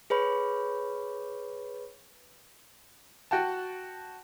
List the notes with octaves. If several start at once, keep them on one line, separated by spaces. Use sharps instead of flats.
G#4 B4 C#5 B5
F#4 F#5 G5 A5